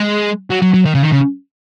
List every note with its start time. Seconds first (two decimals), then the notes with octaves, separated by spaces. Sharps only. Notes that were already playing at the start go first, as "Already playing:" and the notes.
Already playing: G#3
0.50 F#3
0.62 F#3
0.74 F#3
0.85 D#3
0.95 C#3
1.03 D#3
1.12 C#3